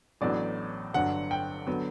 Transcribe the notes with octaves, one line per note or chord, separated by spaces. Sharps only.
A1 A2 F#3 B3 D4 D5
G1 G2 F#3 F#5
G5
D3 F#3 B3